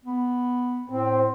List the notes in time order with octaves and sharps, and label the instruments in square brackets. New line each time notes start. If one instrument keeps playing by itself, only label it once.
[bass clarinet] B3
[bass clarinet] A2 [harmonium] C4